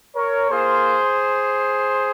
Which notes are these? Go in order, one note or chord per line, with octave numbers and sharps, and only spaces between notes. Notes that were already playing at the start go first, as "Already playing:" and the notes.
A#4 C#5
A#3 F4 G#4 C5